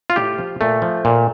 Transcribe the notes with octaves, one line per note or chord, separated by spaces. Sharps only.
F4
A2 G4
F3
A#2 A3
F3
A#2